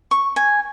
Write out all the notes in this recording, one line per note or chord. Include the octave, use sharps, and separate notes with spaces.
C#6
G#5